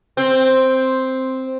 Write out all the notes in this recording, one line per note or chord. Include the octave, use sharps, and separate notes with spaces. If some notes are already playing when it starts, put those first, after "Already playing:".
C4